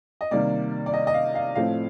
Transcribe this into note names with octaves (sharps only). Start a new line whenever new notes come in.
D#5
C3 D#3 G3 A#3 D5
D5
D#5
D#5
F5
F5
A2 F3 A3 C4 F5